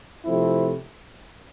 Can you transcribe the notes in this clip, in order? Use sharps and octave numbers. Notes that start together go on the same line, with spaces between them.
C3 F3 A3 C4 E4